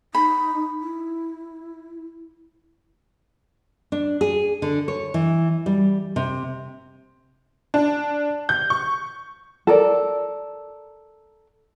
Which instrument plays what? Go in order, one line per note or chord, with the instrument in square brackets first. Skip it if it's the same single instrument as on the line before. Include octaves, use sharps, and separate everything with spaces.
[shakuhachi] D#4 [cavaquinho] B5
[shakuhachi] E4
[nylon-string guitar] D4
G#4
D3
C#5
E3
G3
C3
[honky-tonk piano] D4
G6
C#6
[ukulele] A4 A#4 D5